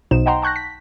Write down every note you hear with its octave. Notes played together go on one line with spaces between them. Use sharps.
B1 B2 D#4 C5 E7
D#5 F#5 G5 A#5 C6
A5 C#6 F#6 G6 A#6
B6